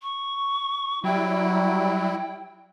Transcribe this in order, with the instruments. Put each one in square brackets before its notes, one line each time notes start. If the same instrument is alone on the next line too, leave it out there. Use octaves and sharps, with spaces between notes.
[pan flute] C#6
[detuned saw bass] F#3 [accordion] G3 E4 [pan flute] G5